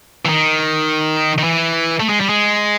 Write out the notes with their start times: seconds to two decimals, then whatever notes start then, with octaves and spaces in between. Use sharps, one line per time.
0.25 E3
0.29 D#3
1.38 D#3
1.44 E3
2.00 A3
2.09 G#3
2.20 G3
2.29 G#3